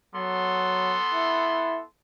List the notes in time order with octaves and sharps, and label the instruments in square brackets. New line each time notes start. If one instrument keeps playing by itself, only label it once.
[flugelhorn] F#3 [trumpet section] B3 A4 C6
[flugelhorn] E4